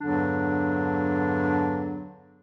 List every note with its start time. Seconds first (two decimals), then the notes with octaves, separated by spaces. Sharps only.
0.01 E2 G2 D3 F#3 D4